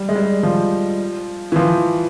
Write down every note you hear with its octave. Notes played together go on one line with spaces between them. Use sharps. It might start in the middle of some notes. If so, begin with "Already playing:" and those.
Already playing: G3
G#3
G3
F3
E3
F3